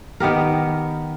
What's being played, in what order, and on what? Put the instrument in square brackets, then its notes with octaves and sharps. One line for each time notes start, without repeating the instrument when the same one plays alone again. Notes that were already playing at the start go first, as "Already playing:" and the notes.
[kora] D#3 B3 G4 A#4